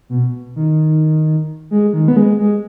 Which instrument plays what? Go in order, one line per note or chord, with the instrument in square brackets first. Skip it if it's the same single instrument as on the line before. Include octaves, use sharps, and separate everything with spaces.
[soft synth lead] B2
D#3
G#3
D#3
B3
G#3
G#3